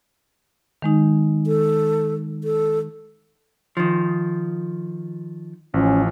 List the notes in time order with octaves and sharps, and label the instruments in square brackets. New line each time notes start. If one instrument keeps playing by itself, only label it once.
[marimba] D#3 G#3 D#4
[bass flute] A4
A4
[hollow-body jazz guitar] D#3 F3
[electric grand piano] A1 F3 [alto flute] C#4